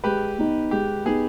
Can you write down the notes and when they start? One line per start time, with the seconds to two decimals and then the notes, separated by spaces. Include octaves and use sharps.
0.04 G#3 G4 B4
0.38 B3 D#4
0.71 G#3 G4
1.05 B3 D#4 G#4